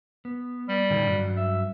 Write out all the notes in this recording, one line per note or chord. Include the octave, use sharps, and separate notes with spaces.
B3
G3
A2 D3 D#3
G2 F#3
E5